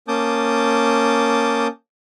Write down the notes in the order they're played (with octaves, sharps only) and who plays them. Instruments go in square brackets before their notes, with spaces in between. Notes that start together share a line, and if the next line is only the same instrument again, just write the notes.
[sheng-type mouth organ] A#3 C#4 A5 D6 D#6 G6